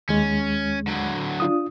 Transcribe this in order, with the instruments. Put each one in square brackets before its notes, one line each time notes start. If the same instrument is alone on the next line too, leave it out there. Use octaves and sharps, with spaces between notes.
[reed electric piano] D#2 G#3 [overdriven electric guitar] C#4
[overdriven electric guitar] D3 F#3
[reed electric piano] D4 F4 D#6